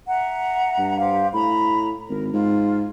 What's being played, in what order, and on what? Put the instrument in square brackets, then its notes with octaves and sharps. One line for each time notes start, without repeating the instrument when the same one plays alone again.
[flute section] E5 F#5 A#5
[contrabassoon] G2
[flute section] G4 C5 F5
[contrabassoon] A2 [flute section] A#5 B5
[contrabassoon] G#1 [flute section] A#4
[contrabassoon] G#2 [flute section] F4